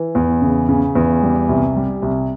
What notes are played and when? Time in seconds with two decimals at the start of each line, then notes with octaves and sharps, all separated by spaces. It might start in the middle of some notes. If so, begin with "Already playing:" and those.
Already playing: E3
0.15 E2
0.42 C#3
0.69 C#3
0.95 E2
1.22 G3
1.49 C2
1.76 G3
2.02 C2